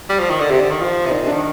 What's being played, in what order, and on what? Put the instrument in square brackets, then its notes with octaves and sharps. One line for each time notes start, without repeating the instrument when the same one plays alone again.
[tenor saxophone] G3
F3
D#3
D3
[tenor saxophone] C3 [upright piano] G4
[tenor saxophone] D3
D#3
[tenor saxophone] F3 [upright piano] F4
[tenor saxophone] C3
[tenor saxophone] A#2 [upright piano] D#4
[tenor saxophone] C3
[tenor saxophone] D#3 [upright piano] D4